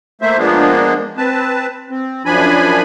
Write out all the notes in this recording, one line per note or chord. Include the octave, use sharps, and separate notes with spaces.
A3 A#3 C5 E5
F3 G#3 A#3 B3 D4
C4 B4 A5
C4
F#2 F3 D4 G#5 B5